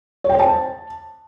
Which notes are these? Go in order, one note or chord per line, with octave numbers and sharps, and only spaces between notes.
C#5
G5
C5
A5